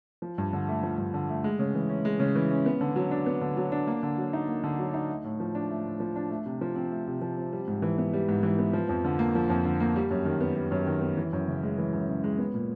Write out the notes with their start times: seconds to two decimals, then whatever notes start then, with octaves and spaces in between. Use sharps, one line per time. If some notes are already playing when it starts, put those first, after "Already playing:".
0.22 F3
0.38 G2
0.53 D3
0.68 A3
0.83 F3
0.98 G2
1.14 D3
1.29 A3
1.44 G#3
1.59 C#3
1.75 E3
1.89 C#4
2.05 G#3
2.19 C#3
2.35 E3
2.51 C#4
2.66 B3
2.81 D3
2.96 F#3
3.11 D4
3.26 B3
3.41 D3
3.57 F#3
3.72 D4
3.87 A#3
4.03 D3
4.18 F#3
4.33 D#4
4.48 A#3
4.64 D3
4.79 F#3
4.94 D#4
5.09 A3
5.24 A2
5.40 F3
5.55 D4
5.70 A3
5.85 A2
6.00 F3
6.16 D4
6.30 A3
6.46 C3
6.61 F3
6.76 C4
6.91 A3
7.07 C3
7.22 F3
7.37 C4
7.52 G3
7.67 G#2
7.82 E3
7.98 B3
8.13 G3
8.28 G#2
8.43 E3
8.59 B3
8.73 F3
8.89 F2
9.05 D3
9.19 A#3
9.35 F3
9.50 F2
9.65 D3
9.80 A#3
9.96 G3
10.11 F#2
10.25 D#3
10.40 B3
10.56 G3
10.72 F#2
10.87 D#3
11.01 B3
11.17 E3
11.33 F#2
11.48 C#3
11.63 G#3
11.78 E3
11.93 F#2
12.09 C#3
12.24 G#3
12.38 B3
12.54 A#2